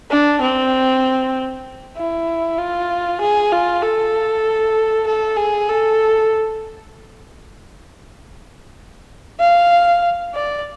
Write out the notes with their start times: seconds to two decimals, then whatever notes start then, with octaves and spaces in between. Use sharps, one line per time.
0.10 D4
0.41 C4
1.97 E4
2.58 F4
3.21 G#4
3.52 F4
3.82 A4
5.07 A4
5.37 G#4
5.69 A4
9.40 F5
10.34 D5